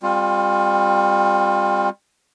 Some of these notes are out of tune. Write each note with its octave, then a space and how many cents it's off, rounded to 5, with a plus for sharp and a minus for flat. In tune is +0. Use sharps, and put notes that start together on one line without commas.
G3 +35 C4 +0 F4 +25